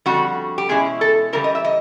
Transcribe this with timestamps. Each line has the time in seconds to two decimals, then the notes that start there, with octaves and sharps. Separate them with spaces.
0.06 F2 D3 G3 F#4
0.58 G4
0.69 E2 B2 G#3 C#4 E4 G#4
1.01 A4
1.33 C#3 E3 G3 A#4
1.44 D#5
1.55 E5
1.65 D#5